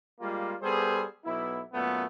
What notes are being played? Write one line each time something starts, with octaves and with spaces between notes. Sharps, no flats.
G3 G#3 A#3 F4
G3 B3 G#4 A4 C5
B1 B3 E4
F#2 A#2 A3 B3